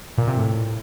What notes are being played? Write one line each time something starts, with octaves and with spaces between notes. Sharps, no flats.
A#2
C3
A2